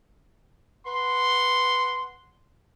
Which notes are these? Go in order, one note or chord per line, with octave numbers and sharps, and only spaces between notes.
B4 F#5 C6